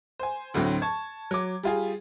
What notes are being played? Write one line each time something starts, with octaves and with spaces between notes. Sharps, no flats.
C5 G#5
D2 A2 D3 F#3 C4
A5 C#6 G#6
F#3 D6
G3 F4 G#4